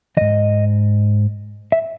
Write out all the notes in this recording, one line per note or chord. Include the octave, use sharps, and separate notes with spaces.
G#2 E3 D#5
E5